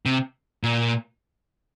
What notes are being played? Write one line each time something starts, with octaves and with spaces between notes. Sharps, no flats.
C3
A#2